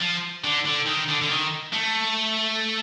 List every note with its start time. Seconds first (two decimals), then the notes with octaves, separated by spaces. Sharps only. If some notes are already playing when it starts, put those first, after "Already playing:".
0.01 F3
0.44 D3
0.66 D3
0.87 D#3
1.09 D3
1.21 D3
1.30 D#3
1.73 A3